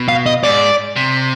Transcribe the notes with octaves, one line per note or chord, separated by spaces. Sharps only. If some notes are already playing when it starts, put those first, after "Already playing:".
Already playing: B2
F5
D#5
G#2 D5
C3